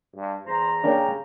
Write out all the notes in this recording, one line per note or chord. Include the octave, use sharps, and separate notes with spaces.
G2
E2 C5 A#5
C#3 A#3 C#4 D4 G4